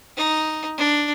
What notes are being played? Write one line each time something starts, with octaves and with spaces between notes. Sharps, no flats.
D#4
D4